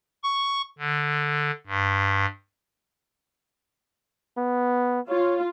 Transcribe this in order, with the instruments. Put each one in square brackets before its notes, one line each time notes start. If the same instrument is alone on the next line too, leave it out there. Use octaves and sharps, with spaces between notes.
[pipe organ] C#6
D3
G2
[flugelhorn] B3
[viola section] F4 [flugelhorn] C#5